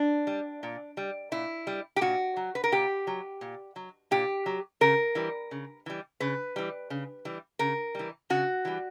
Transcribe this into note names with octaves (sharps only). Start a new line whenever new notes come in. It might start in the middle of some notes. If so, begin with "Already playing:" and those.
Already playing: D4
G3
A#2
G3
A#2 E4
G3
G4
A#2 F#4
F#3
B4
A#4
A#2 G4
F#3
A#2
F#3
A#2 G4
F#3
C#3 A#4
E3 G3
C#3
E3 G3
C#3 B4
E3 G3
C#3
E3 G3
C#3 A#4
E3 G3
C#3 F#4
E3 G3